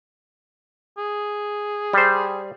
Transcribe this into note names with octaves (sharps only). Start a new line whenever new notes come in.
G#4
G3 C5